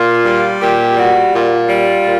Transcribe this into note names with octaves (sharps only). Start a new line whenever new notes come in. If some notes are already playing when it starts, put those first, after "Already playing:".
Already playing: A#2 F4
G3
A#2 G4
G3 F#4
A#2 F4
G3
A#2